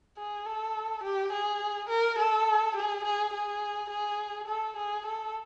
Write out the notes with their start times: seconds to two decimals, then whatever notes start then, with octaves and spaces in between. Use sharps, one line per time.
0.18 G#4
0.45 A4
1.03 G4
1.32 G#4
1.89 A#4
2.19 A4
2.76 G#4
3.04 G#4
3.33 G#4
3.90 G#4
4.47 A4
4.76 G#4
5.06 A4